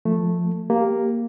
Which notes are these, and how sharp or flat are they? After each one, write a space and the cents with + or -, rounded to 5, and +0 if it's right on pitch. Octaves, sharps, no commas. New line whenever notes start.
F3 +0 A3 +0 A4 +0
A#3 +0 G4 +0